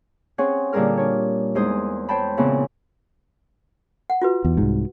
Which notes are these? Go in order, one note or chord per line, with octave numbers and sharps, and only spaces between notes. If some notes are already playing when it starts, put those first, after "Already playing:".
C4 C#4 G#4 C#5 F#5
A#2 D3 G3 G#4 A#4 F6
D4 C#5
E2 G#3 D#4 G#4 C5 D#6
C5 C#5 G5 A5 B5
A#2 C#3 E3 B3 C4
F#5
F4 F#4 B4
E2
C2 G#2